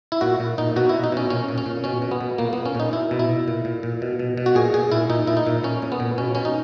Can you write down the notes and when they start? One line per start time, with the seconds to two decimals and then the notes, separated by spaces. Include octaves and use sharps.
0.12 E4
0.21 A#2 F#4
0.40 A#2
0.58 A#2 D#4
0.76 B2 F#4
0.89 E4
0.94 B2
1.04 D#4
1.12 B2 C#4
1.30 A#2 C#4
1.48 A#2
1.58 C#4
1.66 A#2
1.84 B2 C#4
2.02 B2
2.11 B3
2.21 B2
2.38 A#2 A#3
2.53 B3
2.57 A#2
2.66 C#4
2.75 A#2 D#4
2.93 B2 E4
3.11 B2
3.19 E4
3.29 B2
3.48 A#2
3.65 A#2
3.83 A#2
4.02 B2
4.19 B2
4.37 B2
4.46 F#4
4.55 A#2 G#4
4.74 A#2 G#4
4.92 A#2 E4
5.09 A#2 D#4
5.27 A#2 E4
5.37 D#4
5.47 A#2
5.63 A#2 C#4
5.82 A#2
5.92 B3
6.00 A#2
6.18 B2 C#4
6.35 B2 C#4
6.45 D#4